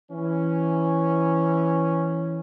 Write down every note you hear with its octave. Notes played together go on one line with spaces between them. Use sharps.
E3 C#4